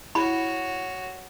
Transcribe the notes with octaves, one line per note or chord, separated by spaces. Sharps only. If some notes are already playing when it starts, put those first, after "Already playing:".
E4 F#4 C#5 F#5 B5